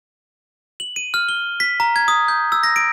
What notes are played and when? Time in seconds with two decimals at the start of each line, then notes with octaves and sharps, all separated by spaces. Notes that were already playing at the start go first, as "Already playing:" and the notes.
0.80 F#7
0.96 D#7
1.14 F6
1.29 G7
1.60 B6
1.80 A#5
1.96 G#6
2.08 D#6
2.28 G6
2.52 E6
2.63 A#6
2.76 D7